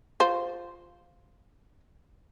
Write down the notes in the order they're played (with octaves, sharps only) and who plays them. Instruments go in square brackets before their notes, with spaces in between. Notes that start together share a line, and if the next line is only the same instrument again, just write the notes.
[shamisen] F4 C5